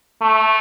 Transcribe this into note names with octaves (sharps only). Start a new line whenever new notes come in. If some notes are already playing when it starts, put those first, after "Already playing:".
A3